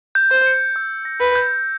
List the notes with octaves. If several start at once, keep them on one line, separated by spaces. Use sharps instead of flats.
G6
C5
C#7
E6
A#6
B4
G6